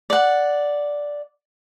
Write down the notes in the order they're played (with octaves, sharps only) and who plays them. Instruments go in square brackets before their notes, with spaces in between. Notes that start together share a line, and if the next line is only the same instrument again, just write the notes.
[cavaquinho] D5 F#5